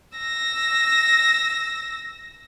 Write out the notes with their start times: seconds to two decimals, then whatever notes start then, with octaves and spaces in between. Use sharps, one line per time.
0.18 E6 A#6